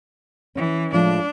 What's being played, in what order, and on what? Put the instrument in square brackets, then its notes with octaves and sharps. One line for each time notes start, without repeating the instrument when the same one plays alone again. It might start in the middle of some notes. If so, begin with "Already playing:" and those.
[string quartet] E3 [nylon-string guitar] C#4
[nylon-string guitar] A2 F3 G#3 [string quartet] D4